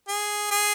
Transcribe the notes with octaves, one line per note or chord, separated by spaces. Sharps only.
G#4
G#4